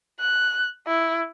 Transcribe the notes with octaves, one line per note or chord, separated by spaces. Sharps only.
F#6
E4